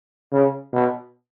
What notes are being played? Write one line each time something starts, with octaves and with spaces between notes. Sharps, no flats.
C#3
B2